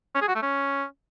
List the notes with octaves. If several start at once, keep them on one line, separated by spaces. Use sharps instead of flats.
C#4
G#4
F#4
A3
C#4